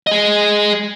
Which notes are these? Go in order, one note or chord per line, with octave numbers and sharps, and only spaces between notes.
G#4 D#5